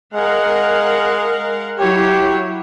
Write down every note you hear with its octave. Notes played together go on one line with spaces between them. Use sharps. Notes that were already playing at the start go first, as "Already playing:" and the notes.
G#3 A#4 F5 F#5
F#3 E4 G4 C#5